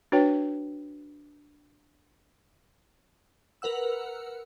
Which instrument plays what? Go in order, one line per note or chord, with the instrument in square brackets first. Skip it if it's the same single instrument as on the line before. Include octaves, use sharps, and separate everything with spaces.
[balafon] D4 F#4 B4 C#5 G5
[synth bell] A#4 B4 F#5 E6